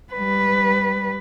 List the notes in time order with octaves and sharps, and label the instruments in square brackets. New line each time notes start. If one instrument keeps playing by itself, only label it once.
[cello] G3 B4